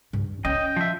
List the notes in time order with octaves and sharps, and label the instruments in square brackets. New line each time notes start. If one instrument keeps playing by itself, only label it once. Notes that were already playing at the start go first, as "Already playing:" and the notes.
[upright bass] G2
[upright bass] C#4 [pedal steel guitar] D#5 [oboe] G5
[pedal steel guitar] F3 E5